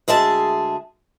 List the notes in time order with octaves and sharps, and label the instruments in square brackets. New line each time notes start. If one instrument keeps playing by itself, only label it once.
[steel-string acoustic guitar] D2 G#3 G#4 E5 A5